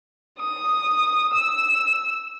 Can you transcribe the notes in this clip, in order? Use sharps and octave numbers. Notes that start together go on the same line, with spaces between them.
D#6
E6